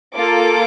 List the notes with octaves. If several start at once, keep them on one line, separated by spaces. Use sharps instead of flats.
A#3 F4 A4 D6